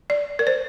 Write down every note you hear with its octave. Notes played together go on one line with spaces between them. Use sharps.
D5
A#4
C5